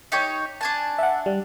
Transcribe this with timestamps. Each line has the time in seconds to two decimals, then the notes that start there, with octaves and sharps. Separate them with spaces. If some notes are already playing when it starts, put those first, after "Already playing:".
0.12 D#4 G4 C#5
0.61 D4 G#5 A5
0.98 E5 F#5
1.26 G3